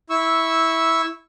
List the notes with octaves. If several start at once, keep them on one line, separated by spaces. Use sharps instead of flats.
E4 C#6 E6